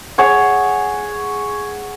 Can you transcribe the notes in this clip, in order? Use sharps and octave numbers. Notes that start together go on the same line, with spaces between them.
G#4 C#5 F#5